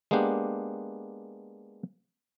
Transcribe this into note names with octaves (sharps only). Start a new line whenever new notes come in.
G#3 A#3 B3 D4 G4